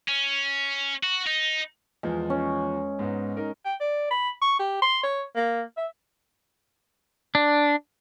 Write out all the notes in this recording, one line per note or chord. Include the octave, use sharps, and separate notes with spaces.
C#4
F#4
D#4
E2 F3 G#3
C#4
G#2 B3 D#4
D#4 A#4
G5
D5
B5
C#6
G4
C6
C#5
A#3
E5
D4